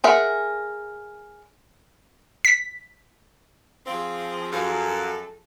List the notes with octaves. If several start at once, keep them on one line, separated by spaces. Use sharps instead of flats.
G#4 A#4 E5 F#5
B6
F3 C4 G#4 F5
F#2 A4 F5